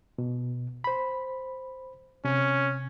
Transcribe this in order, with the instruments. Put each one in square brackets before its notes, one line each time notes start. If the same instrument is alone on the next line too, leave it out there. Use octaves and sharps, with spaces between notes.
[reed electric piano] B2
C5 B5
[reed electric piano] C3 [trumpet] C#4